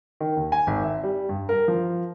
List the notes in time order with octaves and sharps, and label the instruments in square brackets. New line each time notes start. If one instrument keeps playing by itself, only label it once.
[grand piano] D#3
D#2
G#5
G#1
E5
G3
G2
A#4
F3